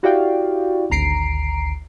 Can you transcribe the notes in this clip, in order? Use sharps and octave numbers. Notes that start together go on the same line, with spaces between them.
E4 F#4 G4 D5 F5 G5
G#1 D2 A#5 C7 D7